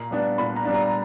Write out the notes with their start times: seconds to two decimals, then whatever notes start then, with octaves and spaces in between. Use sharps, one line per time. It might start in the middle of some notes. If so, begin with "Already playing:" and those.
Already playing: A#2 A#5
0.11 G3 B3 D4
0.38 A#2 B5
0.56 A#5
0.65 G3 B3 D4
0.75 A#5